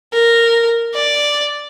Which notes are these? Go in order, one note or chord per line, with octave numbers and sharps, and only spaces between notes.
A#4
D5